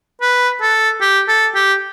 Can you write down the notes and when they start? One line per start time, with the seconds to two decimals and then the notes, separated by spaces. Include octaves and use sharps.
0.21 B4
0.61 A4
1.01 G4
1.28 A4
1.55 G4